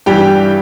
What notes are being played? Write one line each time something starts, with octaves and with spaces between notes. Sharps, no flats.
G2 E3 G3 G4 G5